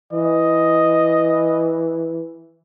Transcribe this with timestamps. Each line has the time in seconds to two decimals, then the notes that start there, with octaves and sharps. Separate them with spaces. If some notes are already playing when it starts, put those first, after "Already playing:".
0.13 E3 D#5